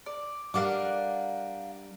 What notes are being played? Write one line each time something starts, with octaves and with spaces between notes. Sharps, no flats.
D5
G3 D4 A#4 F5 F#5 D6